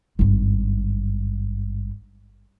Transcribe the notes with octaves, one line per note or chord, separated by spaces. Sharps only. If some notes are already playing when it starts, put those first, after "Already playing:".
G#1 G2